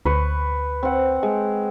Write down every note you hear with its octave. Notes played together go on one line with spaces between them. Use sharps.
D2 B4 C#6
C4 F#5
G#3